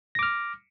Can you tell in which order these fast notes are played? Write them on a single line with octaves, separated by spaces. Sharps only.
A#6 D6 F6